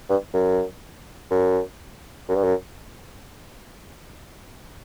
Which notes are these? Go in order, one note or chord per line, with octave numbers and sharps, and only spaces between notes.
G2
F#2
F#2
F#2
G2
F#2